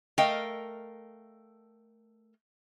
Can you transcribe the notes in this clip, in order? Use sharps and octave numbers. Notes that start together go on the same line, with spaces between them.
A3 A#4 D#5 F5 G5